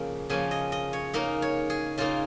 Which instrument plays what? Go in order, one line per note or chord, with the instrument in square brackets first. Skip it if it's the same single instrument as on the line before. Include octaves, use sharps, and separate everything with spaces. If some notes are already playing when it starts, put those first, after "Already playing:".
Already playing: [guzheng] C#3 F3 A#3 C#4
C#3 F3 A#3 C#4 G#5
D#5
D#5
C#5
C#3 A#3 D#4 A#4
C#5
G#4
C#3 A#3 D#4 F4